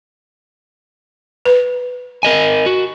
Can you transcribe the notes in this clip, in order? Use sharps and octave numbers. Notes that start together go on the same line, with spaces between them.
B4
A#4 D#5 G#5
F#4